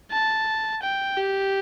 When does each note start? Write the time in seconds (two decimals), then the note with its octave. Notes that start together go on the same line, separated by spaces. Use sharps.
0.12 A5
0.83 G5
1.17 G4